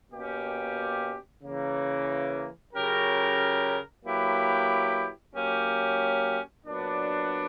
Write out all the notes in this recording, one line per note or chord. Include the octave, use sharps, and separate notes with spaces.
B2 A#3 C#4 G4
C#3 E3 A#3
C#3 F#3 C#4 G4 A#4
F#3 A#3 E4 G4 B4
F#3 A#3 C#4 G4
A#2 F#3 B3 D4